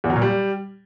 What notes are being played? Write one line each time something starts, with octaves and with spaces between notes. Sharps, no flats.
E2
F#3
A#2
G3